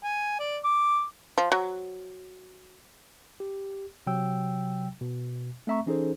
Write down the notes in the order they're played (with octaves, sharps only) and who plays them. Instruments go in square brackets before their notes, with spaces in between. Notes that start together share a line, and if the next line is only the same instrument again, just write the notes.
[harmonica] G#5
D5
D6
[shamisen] F3
F#3
[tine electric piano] G4
C3 F#3 G5 E6
B2
A3 C4 E5 A#5 C#6
E3 C#4 D#4 G#4 A4 C5